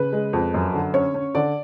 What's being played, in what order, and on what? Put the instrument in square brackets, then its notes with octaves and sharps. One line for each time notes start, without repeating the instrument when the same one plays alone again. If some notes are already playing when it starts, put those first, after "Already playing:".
Already playing: [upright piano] C#3 B4
G#3
F2
F#2
D3
C#4 C#5
C#4
D3 D5